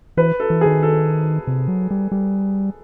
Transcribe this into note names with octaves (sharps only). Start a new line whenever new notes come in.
E3 B4
A4
E3
D#3 G#4
A4
C3
F#3
G3
G3